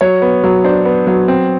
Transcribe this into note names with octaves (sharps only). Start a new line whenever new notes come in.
F#3 C#5
B3
F#3
D4 C5
B3
F#3
C4